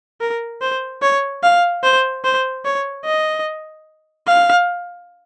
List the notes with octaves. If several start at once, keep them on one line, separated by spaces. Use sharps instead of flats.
A#4
C5
C#5
F5
C5
C5
C#5
D#5
F5